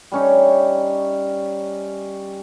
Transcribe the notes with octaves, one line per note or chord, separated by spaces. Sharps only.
G3 C#4 D#4